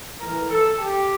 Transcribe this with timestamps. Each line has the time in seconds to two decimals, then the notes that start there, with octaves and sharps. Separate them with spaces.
0.20 A2 E3 A#4
0.49 A4
0.78 G4